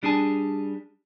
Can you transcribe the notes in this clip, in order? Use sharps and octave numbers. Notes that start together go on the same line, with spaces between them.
G3 D4 G#4 G#5 A5